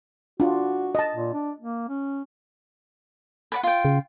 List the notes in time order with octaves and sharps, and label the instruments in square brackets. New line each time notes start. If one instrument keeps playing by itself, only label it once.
[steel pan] D4 F4 [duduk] F#4
[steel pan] D#5 A5
[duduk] A#2
D4
A#3
C#4
[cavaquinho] B4 D5 F#5
F4 G5
[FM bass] C#3